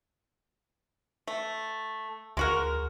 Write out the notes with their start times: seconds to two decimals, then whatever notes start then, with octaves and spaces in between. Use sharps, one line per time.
1.27 A3
2.37 D2 G#3 F#4 A#4